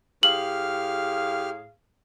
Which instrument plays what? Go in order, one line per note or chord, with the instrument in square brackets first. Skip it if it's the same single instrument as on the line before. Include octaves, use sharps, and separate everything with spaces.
[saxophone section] A2 G#4 F5 [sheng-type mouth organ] G4 F6 [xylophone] F#7